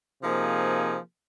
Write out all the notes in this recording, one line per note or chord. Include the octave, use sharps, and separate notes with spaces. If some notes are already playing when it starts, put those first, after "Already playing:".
C3 F3 A#3 D#4 G#4